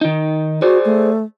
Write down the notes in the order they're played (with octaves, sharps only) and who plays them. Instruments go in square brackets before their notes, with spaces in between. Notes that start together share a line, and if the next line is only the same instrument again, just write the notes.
[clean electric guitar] D#3 D#4
[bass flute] F#4 [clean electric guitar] G#4 C5 D5
[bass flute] A3